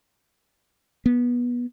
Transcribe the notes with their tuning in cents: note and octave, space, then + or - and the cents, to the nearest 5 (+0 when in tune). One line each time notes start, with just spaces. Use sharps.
B3 -20